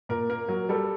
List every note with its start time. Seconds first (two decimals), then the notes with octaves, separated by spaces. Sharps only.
0.09 A#2 A#4
0.29 A#3 A#4
0.48 F#3
0.69 G3 A4